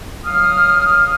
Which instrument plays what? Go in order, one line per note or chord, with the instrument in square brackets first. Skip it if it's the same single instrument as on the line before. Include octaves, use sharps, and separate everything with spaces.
[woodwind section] F#3 F5 D#6 F6